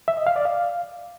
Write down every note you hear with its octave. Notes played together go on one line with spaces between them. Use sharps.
E5
D#5
F5
D5
F5